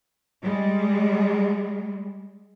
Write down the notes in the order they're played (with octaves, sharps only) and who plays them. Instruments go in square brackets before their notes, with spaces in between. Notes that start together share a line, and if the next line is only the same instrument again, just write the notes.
[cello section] G3 G#3